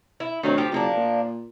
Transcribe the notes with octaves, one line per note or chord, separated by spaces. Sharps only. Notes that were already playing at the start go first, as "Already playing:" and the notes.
E4
D2 D#3 F#3 C4
F3 G4
F#1 F3 A#3 D4
A#2